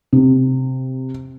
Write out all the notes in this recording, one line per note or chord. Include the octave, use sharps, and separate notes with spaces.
C3